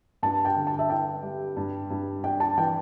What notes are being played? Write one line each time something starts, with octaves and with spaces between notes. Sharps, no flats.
G2 A5
G5
D3
A5
E5
E4 G5
G3
G2
G2
D4 G5
A5
E3 G5